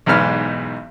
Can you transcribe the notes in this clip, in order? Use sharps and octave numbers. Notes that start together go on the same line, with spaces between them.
B1 E2 G#2 B3 F6